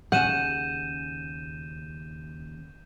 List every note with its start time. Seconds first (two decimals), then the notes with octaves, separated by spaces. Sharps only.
0.12 D#2 C#3 F#5 G6 D#7 E7